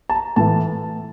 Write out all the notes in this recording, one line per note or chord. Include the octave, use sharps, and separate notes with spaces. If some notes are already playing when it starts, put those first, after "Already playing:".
A5
A#5
A2 E3 A5